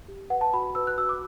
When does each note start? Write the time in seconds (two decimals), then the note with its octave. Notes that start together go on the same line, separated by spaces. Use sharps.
0.08 G4
0.30 B4 F#5
0.41 A5
0.53 F#4 B5
0.75 B4 E6
0.87 F#6
0.98 F#4 E6
1.09 D6